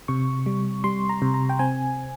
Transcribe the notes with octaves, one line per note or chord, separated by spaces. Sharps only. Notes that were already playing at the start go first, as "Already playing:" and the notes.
C3 C#6
G3
G3 C6
A#5
C3
A#5
G5
C4 G#5